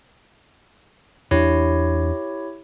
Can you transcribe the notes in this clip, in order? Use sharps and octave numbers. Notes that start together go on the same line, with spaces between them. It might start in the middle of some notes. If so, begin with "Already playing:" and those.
E2 D4 E4 G4 C#5